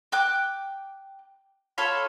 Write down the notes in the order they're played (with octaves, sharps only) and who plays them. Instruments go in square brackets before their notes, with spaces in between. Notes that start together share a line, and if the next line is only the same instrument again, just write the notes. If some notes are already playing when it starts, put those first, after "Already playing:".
[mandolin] G5 D6 F#6
F4 A4 C#5 B5